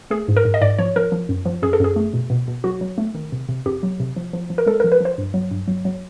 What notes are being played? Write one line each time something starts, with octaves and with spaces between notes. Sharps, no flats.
A3 G#4
G#2
A#4
G#2
D#5
G#2 D5
F3 C#5
F3 A#4
F3
F#2
F3
F#2 G#4
A4
F#2 G#4
A3
B2
B2
B2
F#3 F#4
F#3
A3
D#3
C3
C3
F2 G4
F#3
C3
F3
F3
F3
A#4
G#3 A4
F3 A#4
B4
F3 C5
G2
F#3
G2
F#3
F#3